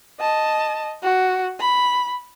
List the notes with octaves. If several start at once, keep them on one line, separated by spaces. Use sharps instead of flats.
D#5 A5
F#4
B5